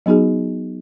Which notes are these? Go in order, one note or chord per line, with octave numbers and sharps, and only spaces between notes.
F#3 B3 D#4 F#4 G#4